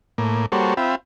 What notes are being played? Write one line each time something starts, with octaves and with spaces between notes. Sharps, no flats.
A2 A#3
G3 A#3 F#4 A4 C5 C#5
C4 F4 E5 G5 B5